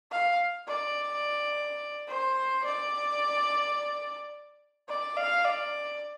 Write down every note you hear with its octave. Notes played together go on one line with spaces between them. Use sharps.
F5
D5
C5
D5
D5
F5
D5